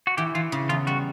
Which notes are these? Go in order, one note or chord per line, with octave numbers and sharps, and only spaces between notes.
F#4
E3 G4
E3 F4
C#3
E2 F4
G3 F#4